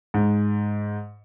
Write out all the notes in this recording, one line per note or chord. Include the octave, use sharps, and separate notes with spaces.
G#2